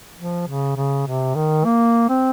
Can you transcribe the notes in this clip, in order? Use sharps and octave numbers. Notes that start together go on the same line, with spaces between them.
F3
C#3
C#3
C3
D#3
A#3
C4